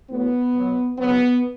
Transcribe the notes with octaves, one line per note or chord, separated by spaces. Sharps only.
A2 F#3 B3
B2 F#3
C#3 F#3 B3